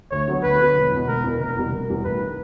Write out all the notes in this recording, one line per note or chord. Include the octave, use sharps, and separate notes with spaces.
D2 C#5
D3 F#3 B3
D2 B4
D3 F#3 B3
E1
E2 B2
E1 A#4
E2 B2
F1 A#4
E2 B2 G3
F1
E2 B2 G3
A1 B4
D#3